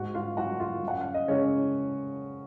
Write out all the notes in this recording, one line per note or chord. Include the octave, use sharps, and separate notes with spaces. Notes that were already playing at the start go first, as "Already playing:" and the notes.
Already playing: G#2 F#4 F#5
F4 F5
F#3 F#4 F#5
F4 F5
F#2 F#5
F5
D#5
C#3 G#3 C#4 C#5